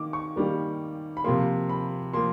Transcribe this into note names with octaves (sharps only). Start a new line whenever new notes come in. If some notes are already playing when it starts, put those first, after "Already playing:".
Already playing: D#3 A#3 D6
C#6
D#3 G3 A#3
B5
C3 F3 A#3 C6
B5
F3 A#3 C6